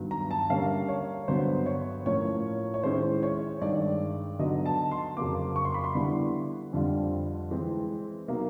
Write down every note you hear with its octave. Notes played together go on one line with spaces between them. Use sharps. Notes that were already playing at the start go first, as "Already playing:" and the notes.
Already playing: G2 D#3 F#3 B3
A#5
A5
D3 G3 A#3 C#4 F5
C#5
G2 D3 F#3 B3 C5
C#5
A2 F3 A#3 C#4 C#5
C#5
D#3 G#3 C#4 E4 C5
C#5
G2 D#3 G#3 D5
D3 F#3 B3 D#4 D#5
A5
C6
F2 C#3 F#3 A#3 D6
C#6
C6
B5
C6
D3 G3 B3 E4
F2 D3 G3 C4 F4
E3 G#3 C4
B2 F#3 A#3 D#4